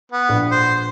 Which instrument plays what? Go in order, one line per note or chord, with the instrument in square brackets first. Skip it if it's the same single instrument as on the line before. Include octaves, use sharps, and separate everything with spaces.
[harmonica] B3
[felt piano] A#1
[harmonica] C5